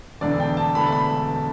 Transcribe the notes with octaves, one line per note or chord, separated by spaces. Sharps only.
E1 E2 D3 A3 D4 D5
G5
A5
E1 E2 D3 A3 D4 B5
A5
B5